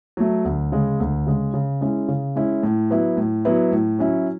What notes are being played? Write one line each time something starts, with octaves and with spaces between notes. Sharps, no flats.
F#3 A3
D2
C#3 G#3
D2
C#3 G#3
C#3
G#3 C#4 E4
C#3
G#3 C#4 E4
A2
F#3 B3 E4
A2
F#3 B3 E4
A2
F#3 C#4 E4